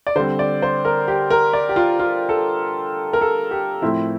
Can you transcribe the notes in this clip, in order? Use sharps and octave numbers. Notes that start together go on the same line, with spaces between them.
D5
D3 G3 C4 C5
D5
C5
A#4
G4
A#4
D5
G4
F4
F4
A4
A#4
A4
G4
A2 F3 C4 E4